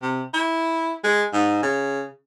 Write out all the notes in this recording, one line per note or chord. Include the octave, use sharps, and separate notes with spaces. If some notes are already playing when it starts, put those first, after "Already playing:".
C3
E4
G#3
G#2
C#3